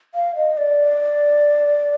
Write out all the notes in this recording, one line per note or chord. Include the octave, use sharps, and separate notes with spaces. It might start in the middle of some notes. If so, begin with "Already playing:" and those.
F5
D#5
D5